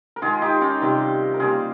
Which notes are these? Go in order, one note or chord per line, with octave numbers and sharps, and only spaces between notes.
A#4
D#3 G#3 F4 G#4
D#4 G4
C#4 F4
C3 D#3 G3
A#4
C#3 G3 A#3 F4 G#4